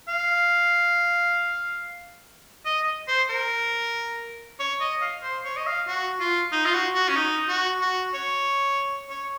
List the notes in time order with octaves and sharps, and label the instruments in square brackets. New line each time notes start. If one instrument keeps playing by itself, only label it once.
[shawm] F5
D#5
C5
A#4
C#5
D#5
F5
C5
C#5
D#5
F5
F#4
F4
D#4
F4
F#4
F#4
C#4
D#4
F#4
F#4
C#5
C#5